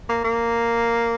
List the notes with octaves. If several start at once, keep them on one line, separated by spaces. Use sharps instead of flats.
A#3
A#3